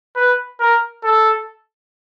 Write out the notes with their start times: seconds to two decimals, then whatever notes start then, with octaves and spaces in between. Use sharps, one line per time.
0.16 B4
0.60 A#4
1.04 A4